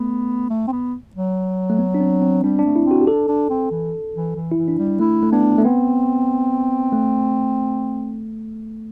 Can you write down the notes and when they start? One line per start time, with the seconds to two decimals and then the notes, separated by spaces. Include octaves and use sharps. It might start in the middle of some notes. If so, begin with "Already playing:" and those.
Already playing: A3 B3
0.50 A3
0.68 C4
0.72 B3
1.15 F#3
1.69 A3
1.79 B3
1.94 D4
2.00 C4
2.22 C4
2.43 G3 D4
2.59 D4
2.65 A3
2.76 E4
2.86 C4
2.91 F#4
3.01 G4
3.07 D4 A4
3.28 D4
3.50 C4
3.71 E3
4.15 E3
4.35 E3
4.51 E4
4.57 E3
4.68 D4
4.79 G3
4.99 A3 E4
5.22 A3
5.32 B3 D4
5.58 A3
5.65 B3 C4
6.93 A3